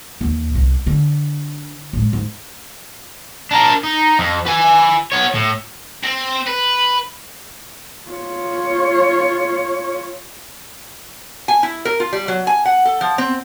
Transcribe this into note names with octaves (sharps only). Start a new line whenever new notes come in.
D#2 E3
C2
D3
A2 G#3
G#2
D4 A#4
D#4
F2
B4 G#5
B3 C#5
A2
C4
B4
F4 C#5
G#5
E4
A#4
F4
G3
F#3
G#5
F#5
A4
F3
C4